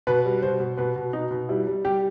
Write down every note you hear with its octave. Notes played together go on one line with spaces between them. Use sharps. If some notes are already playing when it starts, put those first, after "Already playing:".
B2 B4
G3
B2 C5
B2
B2 B4
B2
B2 D#4
B2
G3 E4
G3
G3 G4